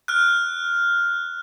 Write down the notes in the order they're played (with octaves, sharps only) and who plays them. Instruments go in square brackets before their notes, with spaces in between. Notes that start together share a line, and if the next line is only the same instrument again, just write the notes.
[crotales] F6 F#6